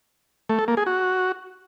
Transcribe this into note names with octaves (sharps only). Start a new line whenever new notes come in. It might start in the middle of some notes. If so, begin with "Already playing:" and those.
A3
A4
A#3
G#4
F#4